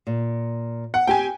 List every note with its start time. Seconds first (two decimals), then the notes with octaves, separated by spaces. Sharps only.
0.07 A#2
0.94 F#5
1.07 C4 G4 G5 G#5